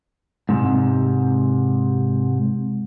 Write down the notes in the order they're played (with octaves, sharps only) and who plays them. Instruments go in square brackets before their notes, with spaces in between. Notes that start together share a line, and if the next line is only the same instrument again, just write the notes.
[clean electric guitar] G#2 C3